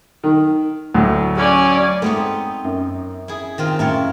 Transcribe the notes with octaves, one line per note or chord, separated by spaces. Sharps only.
D#3
D2 A2 F#3
C#4 D5 G#5
G#3 A3 B3 C4 D#4
F#2
E4 G#4
D#3 C4 F4
A1 F#2 E4 F4 C#5